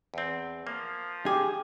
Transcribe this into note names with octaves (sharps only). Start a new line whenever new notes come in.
E2 C4
F3 A#3
G4 G#4